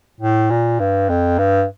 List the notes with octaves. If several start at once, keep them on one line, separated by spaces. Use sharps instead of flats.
A2
A#2
G2
F2
G2